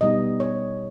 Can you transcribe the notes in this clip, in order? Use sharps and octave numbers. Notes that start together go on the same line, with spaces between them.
B2 G3 B3 D#4 D#5
C#5